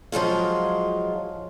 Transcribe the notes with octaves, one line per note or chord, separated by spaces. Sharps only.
F3 F#3 G#3 F4